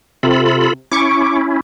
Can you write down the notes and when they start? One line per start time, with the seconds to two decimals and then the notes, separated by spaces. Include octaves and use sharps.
0.23 C3 F4 A4 B5
0.92 C#4 E4 C#6 D6